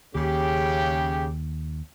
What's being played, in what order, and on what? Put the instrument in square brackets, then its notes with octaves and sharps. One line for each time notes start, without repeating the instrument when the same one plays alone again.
[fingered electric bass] D#2 [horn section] C#3 G4